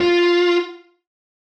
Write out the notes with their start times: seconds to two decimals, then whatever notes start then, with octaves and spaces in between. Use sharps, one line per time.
0.01 F4